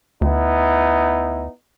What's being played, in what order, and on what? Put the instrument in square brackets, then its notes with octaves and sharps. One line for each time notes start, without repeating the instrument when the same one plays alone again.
[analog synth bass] D2 [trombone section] B3 D#4 E4